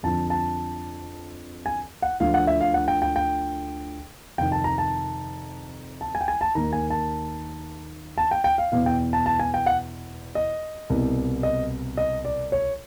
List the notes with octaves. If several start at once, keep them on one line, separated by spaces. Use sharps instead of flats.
F2 D3 F3 A5
A5
G#5
F#5
D2 D3 F3 F5
F#5
E5
F5
F#5
G5
G5
G5
F2 C3 D#3 G5
A5
A#5
A5
A5
G#5
G5
G#5
A5
D#2 D#3 A#5
G#5
A5
A5
G5
G5
F5
E2 B2 F5
G5
A5
A5
G#5
G5
F#5
D#5
C2 B2
D#5
D#5
D5
C#5